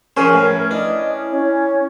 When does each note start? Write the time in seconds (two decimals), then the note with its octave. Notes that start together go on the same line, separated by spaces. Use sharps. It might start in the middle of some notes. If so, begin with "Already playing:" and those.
0.17 F3 C#4 G#4 A#4 C5
0.33 A2 A#4 B4
0.71 D4 E4 D#5
1.31 C#4